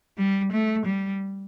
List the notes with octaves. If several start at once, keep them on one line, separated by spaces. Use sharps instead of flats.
G3
A3
G3